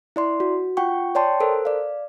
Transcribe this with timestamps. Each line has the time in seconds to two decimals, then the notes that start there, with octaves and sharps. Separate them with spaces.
0.16 E4 D5 C6
0.40 F#4
0.77 F4 F#5 G5 C#6
1.15 C#5 D5 G5 A5 C6
1.40 A4 A#4 C5
1.65 D5 F5